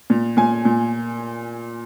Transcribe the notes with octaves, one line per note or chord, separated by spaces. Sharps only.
A#2
A#2 G#5
A#2